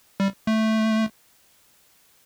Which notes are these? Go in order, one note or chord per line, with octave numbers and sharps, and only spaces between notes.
G3
A3